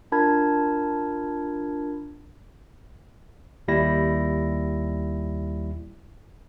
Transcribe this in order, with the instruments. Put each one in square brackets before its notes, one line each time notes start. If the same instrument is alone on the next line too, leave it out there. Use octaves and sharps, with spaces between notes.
[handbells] D4 F4 A#4 A5 B5 G#6
[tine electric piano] D#2 G3 E4 A#6